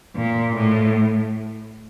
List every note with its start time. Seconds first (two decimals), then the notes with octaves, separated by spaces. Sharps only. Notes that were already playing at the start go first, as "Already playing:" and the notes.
0.16 A#2
0.56 A2